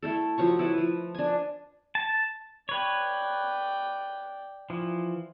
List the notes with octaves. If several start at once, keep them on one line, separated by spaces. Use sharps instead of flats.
A3 E4 A4
F3 F#3 C#6
E4 A4 B4
F3
D4 G#5
A5
B4 C#5 D5 G5
E3 F3